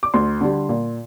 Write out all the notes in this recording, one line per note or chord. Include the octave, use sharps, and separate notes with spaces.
D6
D2 C6
D3 G3
A#2